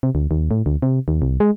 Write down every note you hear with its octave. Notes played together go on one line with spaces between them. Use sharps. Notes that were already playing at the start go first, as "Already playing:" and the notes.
C3
D2
D#2
A2
D2
C3
D#2
C2
G#3